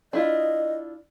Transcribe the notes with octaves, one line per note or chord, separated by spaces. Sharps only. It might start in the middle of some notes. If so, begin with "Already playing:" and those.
D4 E4 F4 D#5